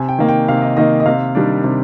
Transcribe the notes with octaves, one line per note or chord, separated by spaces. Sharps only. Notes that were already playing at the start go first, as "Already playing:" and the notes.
Already playing: C3 G#5
G5
D#3 A#3
G5
C3 F5
D#5
D#3 A#3 D#5
D#5
C3 F5
D#3 G3 D4
C3